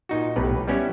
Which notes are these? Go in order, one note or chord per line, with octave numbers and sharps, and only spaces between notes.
A#2 D#4 F#4
B1 A2 B3 G4 B4
G3 B3 C#4 E4